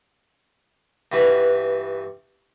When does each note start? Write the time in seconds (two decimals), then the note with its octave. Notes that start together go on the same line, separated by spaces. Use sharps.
1.12 G2 E3 F#4 B4